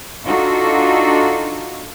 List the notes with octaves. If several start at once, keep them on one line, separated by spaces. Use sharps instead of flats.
D4 D#4 F4 F#4 A4